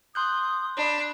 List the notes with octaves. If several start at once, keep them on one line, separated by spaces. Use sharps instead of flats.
C6 D#6 F#6 G6
D4 B5